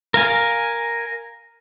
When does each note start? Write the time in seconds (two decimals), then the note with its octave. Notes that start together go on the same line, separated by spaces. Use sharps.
0.14 A#4 F5 G#5